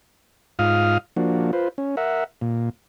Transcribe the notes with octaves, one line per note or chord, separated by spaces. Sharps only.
G#2 F4 F5 D#6 F6
F3 A#3 D4 F#4
F4 B4 C5
C#4
A#4 E5 F#5
A#2